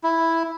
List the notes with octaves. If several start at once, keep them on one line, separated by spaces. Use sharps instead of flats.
E4